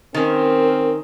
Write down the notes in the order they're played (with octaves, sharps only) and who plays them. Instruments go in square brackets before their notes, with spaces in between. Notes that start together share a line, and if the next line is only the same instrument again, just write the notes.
[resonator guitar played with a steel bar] D#3 C#4 [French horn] C4 [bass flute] A#4